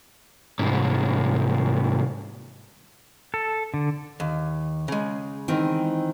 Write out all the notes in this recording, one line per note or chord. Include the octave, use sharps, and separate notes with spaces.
C2 G#2
A4
D3
D#2
C#3 G#3
D#3 E3 C4